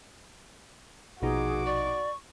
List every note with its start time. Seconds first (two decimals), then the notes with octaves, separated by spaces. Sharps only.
1.22 A#1 B2 D#4 F#4 G#4 D6
1.66 D5 C#6